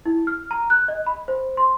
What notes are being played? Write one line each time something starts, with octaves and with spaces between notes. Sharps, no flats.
E4
F6
A#5
F#6
D#5
B5
C5
C6